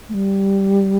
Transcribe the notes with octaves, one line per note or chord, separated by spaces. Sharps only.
A3
G3